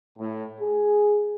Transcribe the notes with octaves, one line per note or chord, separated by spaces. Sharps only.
A2
G#4